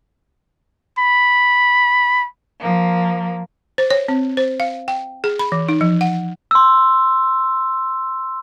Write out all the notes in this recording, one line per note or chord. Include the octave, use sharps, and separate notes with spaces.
B5
F3 A#3
C5
C#5
C4
C5
F5
G5
G#4
B5
E3
D#4
F3
F#5
C6 E6